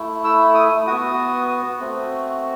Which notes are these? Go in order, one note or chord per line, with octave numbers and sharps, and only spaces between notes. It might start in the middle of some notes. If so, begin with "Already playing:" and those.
Already playing: A3 E4
E6
D#6
B3 F#4 D#6
A3 C4 F#4